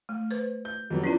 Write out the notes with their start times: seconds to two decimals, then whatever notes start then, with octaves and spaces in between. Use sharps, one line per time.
0.09 A3
0.31 B4 C5
0.65 G6
0.90 F2 F#3 B3
1.04 C#4 D4 E4 F4 B4